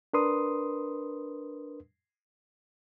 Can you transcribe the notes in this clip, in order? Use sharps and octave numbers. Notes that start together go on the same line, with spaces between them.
D4 A#4 B4 C6 D#6